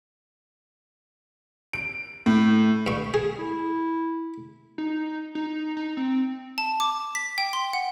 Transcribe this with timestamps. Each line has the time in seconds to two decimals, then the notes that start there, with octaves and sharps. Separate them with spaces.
1.73 D7
2.26 A2
2.87 G2 C#6
3.14 G#4
3.38 E4
4.78 D#4
5.35 D#4
5.77 D#4
5.97 C4
6.58 A5
6.80 D6
7.15 B6
7.38 G5
7.53 C6
7.73 F#5